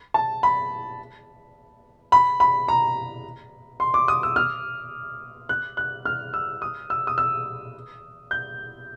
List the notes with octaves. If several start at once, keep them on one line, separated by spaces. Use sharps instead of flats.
A5
B5
B5
B5
A#5
C6
D6
D#6
E6
F6
F#6
F#6
F6
E6
D#6
E6
D#6
E6
G6